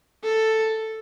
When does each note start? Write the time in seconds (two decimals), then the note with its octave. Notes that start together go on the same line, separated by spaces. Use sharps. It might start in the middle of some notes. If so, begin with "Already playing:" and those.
0.23 A4